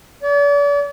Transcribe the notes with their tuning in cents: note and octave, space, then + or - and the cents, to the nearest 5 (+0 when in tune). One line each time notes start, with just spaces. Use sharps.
D5 -40